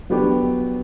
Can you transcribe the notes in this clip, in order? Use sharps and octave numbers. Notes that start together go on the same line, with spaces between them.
F#3 B3 D4 G4